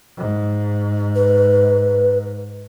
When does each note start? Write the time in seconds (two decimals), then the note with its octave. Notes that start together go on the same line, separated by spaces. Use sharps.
0.17 G#2
1.15 B4